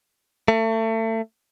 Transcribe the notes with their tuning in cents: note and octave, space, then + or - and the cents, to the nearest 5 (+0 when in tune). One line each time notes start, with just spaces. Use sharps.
A3 +30